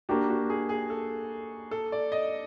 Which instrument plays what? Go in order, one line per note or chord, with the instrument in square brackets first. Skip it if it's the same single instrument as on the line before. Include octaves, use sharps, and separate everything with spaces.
[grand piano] A#3 D4 G4 [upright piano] F#4
[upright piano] F#4
G#4
G#4
A4
A4
D5
D#5